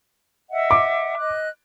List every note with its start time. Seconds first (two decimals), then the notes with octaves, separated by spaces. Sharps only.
0.51 D#5 E5 F#5
0.71 D6
1.19 D#5 F#6